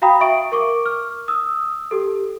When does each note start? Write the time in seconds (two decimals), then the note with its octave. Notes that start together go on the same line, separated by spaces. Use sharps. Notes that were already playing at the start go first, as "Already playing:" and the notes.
0.02 F#4 F5 G5 A#5 B5 D#6
0.21 E5 C#6 D7
0.52 A#4 C#6 D6
0.86 F6
1.28 D#6 E6
1.91 G4 A4